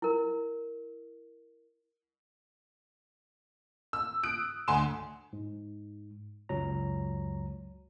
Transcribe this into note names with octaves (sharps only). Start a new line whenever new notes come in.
E4 A#4
E6
D#6 F#6 D7
D2 G#5 C6 E7
G#2
C#2 F#2 F#3 C#5 A#5